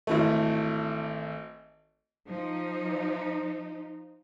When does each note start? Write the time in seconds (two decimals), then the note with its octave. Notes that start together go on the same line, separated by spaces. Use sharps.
0.07 G#1 E3 A3
2.28 F3 D#4